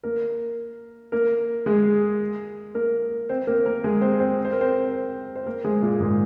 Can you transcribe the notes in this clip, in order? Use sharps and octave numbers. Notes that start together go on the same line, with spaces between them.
A#3 A#4
A#3 A#4
G#3 G#4
A#3 A#4
C4 C5
A#3 A#4
A#3 A#4
G#3 G#4
C4 C5
C4 C5
C5
A#4
C4 C5
C5
A#3 A#4
G#3 G#4
A#2 A#3
G#2 G#3